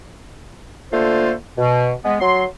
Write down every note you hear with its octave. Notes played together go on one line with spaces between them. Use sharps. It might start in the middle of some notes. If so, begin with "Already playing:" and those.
D3 A3 A#3 F4 A4 C5
B2
G#3 B3
F#3 C6